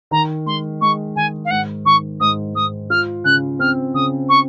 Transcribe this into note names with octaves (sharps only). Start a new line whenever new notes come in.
D#3 A#5
G#3 C6
G#3 C#6
D#3 G#5
F5
G#2 F#5
D#3 C#6
G#2 D#6
G#2 D#6
F4 F6
C#3 F#6
C4 F6
C#3 D#6
C#6